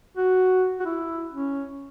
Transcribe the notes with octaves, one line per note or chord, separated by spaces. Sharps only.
F#4
F#4
E4
C#4